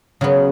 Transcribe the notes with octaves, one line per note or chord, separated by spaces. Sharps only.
C#3 F#3 B3